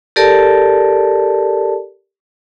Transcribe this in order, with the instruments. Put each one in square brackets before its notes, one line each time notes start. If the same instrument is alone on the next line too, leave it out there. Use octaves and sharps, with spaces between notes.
[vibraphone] G4 A4 A#4 D5 A5